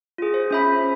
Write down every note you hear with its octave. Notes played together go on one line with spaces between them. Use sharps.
F4 G#4
C5
C#4 E5 B5